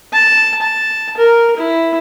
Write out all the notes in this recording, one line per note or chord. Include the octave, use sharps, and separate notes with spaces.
A5
A5
A#4
E4